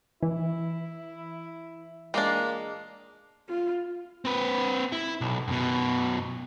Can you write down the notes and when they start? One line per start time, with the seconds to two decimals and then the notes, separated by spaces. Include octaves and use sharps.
0.23 E3 E4
2.14 A#2 G#3 A#3 D4
3.48 F4
4.25 C4 B4
4.92 E4
5.21 B1
5.48 F#2 B2